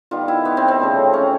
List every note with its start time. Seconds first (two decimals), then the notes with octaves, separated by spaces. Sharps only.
0.11 D#3 G3 B3 F4
0.28 E4
0.45 B3
0.57 C4
0.68 C4
0.80 C#3 F3 A3
1.14 C#4